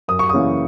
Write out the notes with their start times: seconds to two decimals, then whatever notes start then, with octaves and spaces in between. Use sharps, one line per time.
0.08 F#2 D#6
0.19 C#6
0.29 C#3 E3 A#3 C#4 D#6